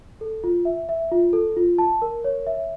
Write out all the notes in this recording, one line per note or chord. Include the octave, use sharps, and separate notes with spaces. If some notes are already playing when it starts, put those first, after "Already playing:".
A4
F4
E5
E5
F4
A4
F4
A5
A#4
C#5
E5